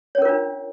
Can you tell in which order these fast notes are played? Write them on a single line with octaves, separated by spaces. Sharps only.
C#5 C#4 A#4 F4 D4